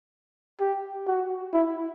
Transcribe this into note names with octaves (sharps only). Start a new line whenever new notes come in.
G4
F#4
E4